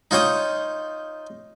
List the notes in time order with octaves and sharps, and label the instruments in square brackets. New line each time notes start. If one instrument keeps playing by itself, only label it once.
[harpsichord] D#4 F4 C#5 G5 D#6